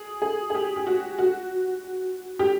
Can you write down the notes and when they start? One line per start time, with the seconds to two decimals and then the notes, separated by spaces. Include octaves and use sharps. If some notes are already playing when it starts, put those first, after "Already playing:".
Already playing: G#4
0.22 G#4
0.50 G#4
0.55 G4
0.76 G4
0.87 F#4
1.19 F#4
2.39 G4